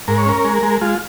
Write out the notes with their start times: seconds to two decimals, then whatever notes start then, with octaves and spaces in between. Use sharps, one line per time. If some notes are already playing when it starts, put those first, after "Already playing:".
0.08 G#2 A#4
0.18 C#5
0.26 C#4 A#4
0.44 G#3
0.63 G#3
0.81 G#3 F4